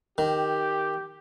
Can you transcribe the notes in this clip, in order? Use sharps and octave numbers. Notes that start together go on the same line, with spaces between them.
D#3 G4